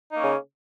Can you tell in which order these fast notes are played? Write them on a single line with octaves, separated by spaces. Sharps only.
D#4 A#3 C#4 C#3